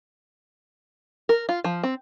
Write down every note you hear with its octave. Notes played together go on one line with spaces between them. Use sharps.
A#4
F4
F3
C4